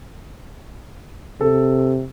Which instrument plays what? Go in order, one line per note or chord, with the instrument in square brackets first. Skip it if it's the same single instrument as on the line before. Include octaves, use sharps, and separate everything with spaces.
[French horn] C3 [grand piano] A4